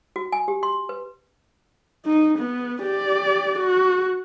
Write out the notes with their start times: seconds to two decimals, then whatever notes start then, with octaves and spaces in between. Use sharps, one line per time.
0.16 F#4
0.32 G#5
0.48 G4
0.63 C6
0.89 B4
2.05 D#4
2.38 B3
2.83 G4 D5
3.58 F#4